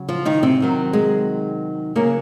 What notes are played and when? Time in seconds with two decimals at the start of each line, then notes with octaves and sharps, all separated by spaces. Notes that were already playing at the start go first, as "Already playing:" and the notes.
Already playing: C#3 F#3
0.09 F3 F4
0.25 D#3 D#4
0.43 C3 C4
0.60 C3 D#3 F#3
0.93 G#3
1.95 C#3 F#3 A#3